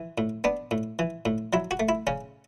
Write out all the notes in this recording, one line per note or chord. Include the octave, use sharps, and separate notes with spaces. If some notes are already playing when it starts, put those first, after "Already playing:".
Already playing: E3
A2
B3 D4
A2
E3
A2
F#3 E4
F#4
A3
E4
C#3 C#4